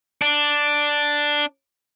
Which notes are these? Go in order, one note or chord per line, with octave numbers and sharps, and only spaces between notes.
D4